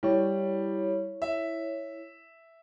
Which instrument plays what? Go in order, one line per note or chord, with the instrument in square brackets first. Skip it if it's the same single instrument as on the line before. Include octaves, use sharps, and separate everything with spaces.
[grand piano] G3 [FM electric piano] E4 C#5
[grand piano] E5